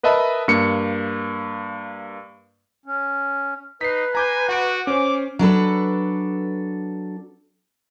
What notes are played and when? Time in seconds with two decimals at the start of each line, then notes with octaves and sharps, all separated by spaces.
0.03 A#4 B4 D#5 E5 A5 B5
0.48 G2 A#3 C#7
2.86 C#4
3.81 D#4 B4 B6 C7
4.15 G#5 A#5 D6 G6
4.49 F#4 F#5 D7
4.87 C#4 C5 G#5 D6
5.39 F#3 D4 A4 B4